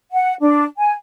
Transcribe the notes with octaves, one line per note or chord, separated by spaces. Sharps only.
F#5
D4
G#5